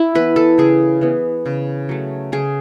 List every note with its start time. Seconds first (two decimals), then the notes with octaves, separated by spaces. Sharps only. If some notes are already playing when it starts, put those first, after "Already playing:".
Already playing: E4
0.15 E3 B3 B4
0.36 A4
0.58 C#3 G#4
1.01 E3 B3
1.46 C#3
1.89 F#3 A3
2.32 C#3 G#4